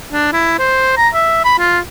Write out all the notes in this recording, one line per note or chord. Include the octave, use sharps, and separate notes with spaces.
D4
E4
C5
A#5
E5
B5
F4